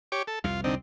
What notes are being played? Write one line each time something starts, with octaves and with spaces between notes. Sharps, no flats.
G4 C#5 D6
A4
C2 F2 C3 F4
D3 C4 D#4